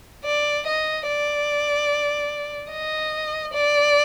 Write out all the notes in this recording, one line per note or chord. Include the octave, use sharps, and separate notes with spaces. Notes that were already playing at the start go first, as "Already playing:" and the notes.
D5
D#5
D5
D#5
D5